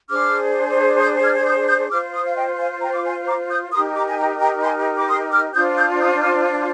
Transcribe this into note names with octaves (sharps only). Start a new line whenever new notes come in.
D4 G#4 C5 D6 F6
D#6 G6
F6 G#6
G#6
D#6 G6
D#6 G6
F4 C5 D6 F6
C6 D#6
F5
D#5 G5
F5 G#5
G5 A#5
D6
G#5 C6
A#5 D6
D#6 G6
D#4 G4 A#4 C6 D#6
A#5 D6
G#5
G5 A#5
G5 A#5
G#5 C6
D6
C6 D#6
D6 F6
D4 F4 C5 D#6 G6
D#6 G6
D#6 G6
G6
D6 F6